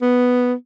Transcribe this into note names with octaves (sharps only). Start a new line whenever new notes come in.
B3